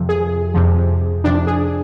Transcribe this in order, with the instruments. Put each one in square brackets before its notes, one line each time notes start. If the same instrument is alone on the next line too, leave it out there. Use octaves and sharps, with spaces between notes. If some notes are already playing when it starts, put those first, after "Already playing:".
Already playing: [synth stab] F2 C3 F3
G#4
F2 C3 F3
F2 C3 F3 D4
G#4